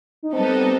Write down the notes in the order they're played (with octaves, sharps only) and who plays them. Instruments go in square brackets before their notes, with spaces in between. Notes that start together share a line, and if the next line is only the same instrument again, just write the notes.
[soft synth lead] D#4
[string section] G3 B3 D#4 A4 [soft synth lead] C4